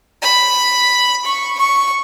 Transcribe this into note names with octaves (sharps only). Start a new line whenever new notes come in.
B5
C#6
C#6